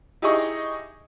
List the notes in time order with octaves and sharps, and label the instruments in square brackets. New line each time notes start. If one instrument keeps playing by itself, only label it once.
[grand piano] D#4 E4 G4 G#4 D#5 C#6